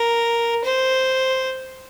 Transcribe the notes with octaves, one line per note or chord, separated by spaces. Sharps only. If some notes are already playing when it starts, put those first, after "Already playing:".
Already playing: A#4
C5